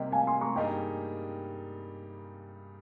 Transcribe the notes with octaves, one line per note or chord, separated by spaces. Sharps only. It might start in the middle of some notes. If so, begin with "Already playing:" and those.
Already playing: C3 G3 A#3 D#5 G5
F5 G#5
G#5 C6
A#5 C#6
G2 G3 A#3 D#4 G#4 D#5 G5